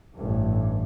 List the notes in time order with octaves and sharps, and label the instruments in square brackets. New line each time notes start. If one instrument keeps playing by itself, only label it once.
[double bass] A1 G2